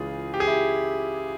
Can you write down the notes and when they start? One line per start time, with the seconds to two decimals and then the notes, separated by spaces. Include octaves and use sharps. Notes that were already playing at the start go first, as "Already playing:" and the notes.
Already playing: C#2 C#3 E3 F4 G#4
0.34 G4
0.40 G#4
0.47 E4 G4